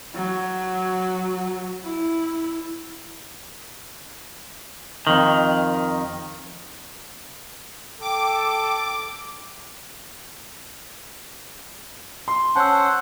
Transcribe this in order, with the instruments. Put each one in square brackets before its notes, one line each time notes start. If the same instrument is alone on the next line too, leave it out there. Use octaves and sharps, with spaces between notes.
[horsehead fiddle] F#3
E4
[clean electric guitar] F2 D#3
[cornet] A4 [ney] G5 [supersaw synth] D6
[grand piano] C6
[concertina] C#4 C5 F#5 [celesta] A5 E6